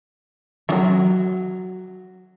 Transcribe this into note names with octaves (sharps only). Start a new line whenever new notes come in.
E3 F#3